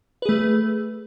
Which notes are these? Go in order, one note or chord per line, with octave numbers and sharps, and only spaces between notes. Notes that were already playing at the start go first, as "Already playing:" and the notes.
A3 G#4 B4